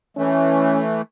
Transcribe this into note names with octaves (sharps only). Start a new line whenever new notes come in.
E3 A3 C#4